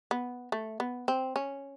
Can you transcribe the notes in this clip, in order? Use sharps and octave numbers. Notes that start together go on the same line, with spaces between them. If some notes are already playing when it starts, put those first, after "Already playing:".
B3
A3
B3
C4
C#4